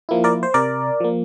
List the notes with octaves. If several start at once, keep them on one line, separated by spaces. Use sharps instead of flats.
F3 A#3 E4
A#4 D5
C5
C3 A#4 D5
F3 A#3